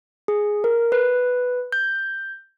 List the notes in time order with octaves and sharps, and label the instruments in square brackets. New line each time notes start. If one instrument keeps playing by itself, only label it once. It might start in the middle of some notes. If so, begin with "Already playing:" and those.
[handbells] G#4
A#4
B4
G6